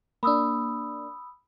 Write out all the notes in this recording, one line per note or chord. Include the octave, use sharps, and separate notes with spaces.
A#3 D4 B5 D#6 E6